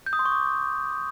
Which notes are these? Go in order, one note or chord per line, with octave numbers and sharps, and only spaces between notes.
G6
D#6
C6
C#6
D6